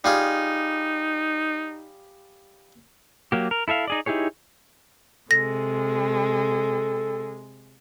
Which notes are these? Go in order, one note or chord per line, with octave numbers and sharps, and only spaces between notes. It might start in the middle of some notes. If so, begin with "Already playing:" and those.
G3 D#4 F4 G#4
F#3 A#3 G4
A#4
E4 A4 E5 F5
D#4 G#4 D5
D#4 E4 G4 G#4 C#5
C3 G#3 A4 A#6